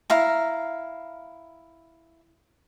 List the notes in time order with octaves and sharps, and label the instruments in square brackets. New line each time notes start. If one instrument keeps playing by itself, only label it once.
[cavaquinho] E4 F5 A#5